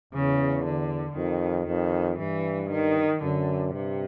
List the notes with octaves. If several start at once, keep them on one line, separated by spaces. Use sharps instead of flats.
E2 C#3
D3
F2 D#3
F2 D#3
G2 E3
D#3
F#2 D3
G2 C3